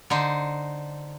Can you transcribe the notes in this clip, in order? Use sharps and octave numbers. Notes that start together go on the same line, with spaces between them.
D3 D#4 C5